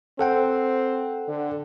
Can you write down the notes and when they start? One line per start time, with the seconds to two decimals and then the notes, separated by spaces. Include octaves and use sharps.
0.19 C4 A4 F#5 G5
1.28 D3